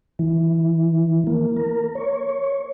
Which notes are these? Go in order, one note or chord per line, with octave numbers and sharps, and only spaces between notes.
E3
A#3
A#4
C#5